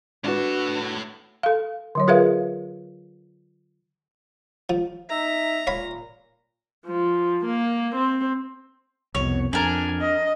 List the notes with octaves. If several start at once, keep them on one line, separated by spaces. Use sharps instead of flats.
A2 D4 F#4 B4 A5
A4 F5
D3 F#3 C#5
F4 G#4 A#4 B4 E5 F5
F3
D#4 E5 A#5
A#2 C#5 F5 B5
F3
A#3
C4
C2 F2 B2 C#5
F2 D4 A#4 G#5
D#5